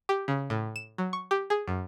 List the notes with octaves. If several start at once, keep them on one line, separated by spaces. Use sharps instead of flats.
G4
C#3
A2
E7
F#3
C#6
G4
G#4
F#2